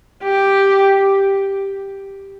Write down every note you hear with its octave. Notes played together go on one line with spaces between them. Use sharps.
G4